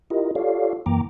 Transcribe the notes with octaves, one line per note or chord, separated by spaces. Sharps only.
E4 F4 G4 A#4 D#5
F4 G4 A4 C#5 D5 F5
F#2 E3 A#3 G5 A#5 D6